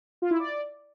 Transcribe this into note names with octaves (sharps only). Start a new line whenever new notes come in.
F4
E4
D5